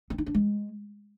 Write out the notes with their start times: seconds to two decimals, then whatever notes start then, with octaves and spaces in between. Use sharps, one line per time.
0.10 C4
0.18 D#4
0.26 D4
0.35 G#3